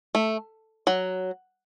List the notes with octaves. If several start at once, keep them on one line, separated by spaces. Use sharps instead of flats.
A3
F#3